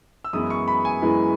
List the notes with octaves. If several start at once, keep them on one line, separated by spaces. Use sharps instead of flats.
E6
F#2 E3 G#3 B3 E4 D#6
C#6
B5
G#5
F#2 E3 G#3 B3 E4